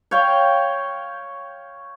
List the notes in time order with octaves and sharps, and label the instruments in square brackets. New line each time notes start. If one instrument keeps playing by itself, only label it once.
[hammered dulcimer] C#5 F5 G5